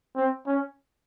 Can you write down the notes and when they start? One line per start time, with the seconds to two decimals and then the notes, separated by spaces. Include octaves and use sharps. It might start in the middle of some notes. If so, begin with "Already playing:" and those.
0.16 C4
0.47 C#4